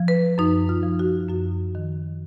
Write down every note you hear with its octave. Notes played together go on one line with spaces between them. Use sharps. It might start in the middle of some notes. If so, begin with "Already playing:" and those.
Already playing: F3
B4
F#2 D#4
F4
F3
F#4
F#2 F#4
D#3